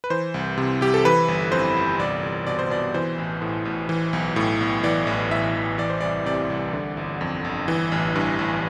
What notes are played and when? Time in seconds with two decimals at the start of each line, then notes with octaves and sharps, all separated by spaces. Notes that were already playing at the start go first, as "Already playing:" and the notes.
0.04 B4
0.10 E3 C5
0.34 C2
0.58 C3
0.81 C2 G4
0.94 A4
1.05 E3 B4
1.28 G1
1.52 F2 C5
1.76 G1
1.99 C2 D5
2.23 C2
2.47 B2 D5
2.59 C5
2.70 B2 D5
2.94 E3 C5
3.18 A1
3.42 A2
3.65 A1
3.89 E3
4.13 B1
4.36 A2
4.60 B1
4.83 E3 D5
5.07 A1
5.31 A2 E5
5.55 A1
5.78 E3 D5
5.90 C5
6.01 C2 D5
6.26 C3 D5
6.50 C2
6.73 D3
6.97 G1
7.21 F2
7.45 G1
7.68 E3
7.92 A1
8.15 G2
8.39 A1